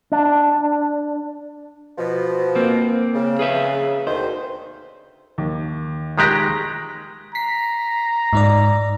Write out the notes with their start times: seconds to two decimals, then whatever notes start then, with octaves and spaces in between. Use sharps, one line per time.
0.12 D4
1.98 B2 F3
2.55 A#3 C4
3.14 C#3
3.39 G#4 B4 E5
4.07 D2 B2 D#3 C5
5.38 D#2
6.18 D#3 G#3 G4 A#5 F#6 A#6
7.35 A#5 B6 C7
8.33 G#2 D#4 D5